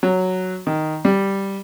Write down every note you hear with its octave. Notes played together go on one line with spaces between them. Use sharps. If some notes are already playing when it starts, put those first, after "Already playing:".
F#3
D#3
G3